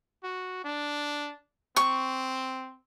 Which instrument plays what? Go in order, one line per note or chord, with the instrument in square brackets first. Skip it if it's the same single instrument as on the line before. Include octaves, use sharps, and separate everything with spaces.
[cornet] F#4
D4
[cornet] C4 [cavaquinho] C#6